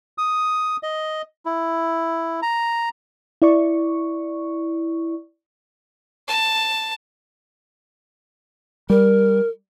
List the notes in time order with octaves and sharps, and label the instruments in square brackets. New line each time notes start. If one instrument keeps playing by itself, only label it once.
[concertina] D#6
D#5
E4
A#5
[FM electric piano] E4 D5 C#6
[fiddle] A5
[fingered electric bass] G3 [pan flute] A#4